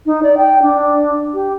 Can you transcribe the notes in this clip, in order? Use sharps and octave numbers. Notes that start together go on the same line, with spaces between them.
D#4
D5
G5
D4
G4